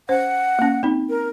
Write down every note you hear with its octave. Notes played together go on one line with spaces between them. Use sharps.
C#4 C5 F#5
A#3 C#4
C4 D#4
A#4